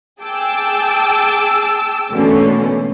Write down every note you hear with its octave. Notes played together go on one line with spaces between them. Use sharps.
G#4 G5 A5 D6 E6
B2 D3 E3 A3 A#3 C#4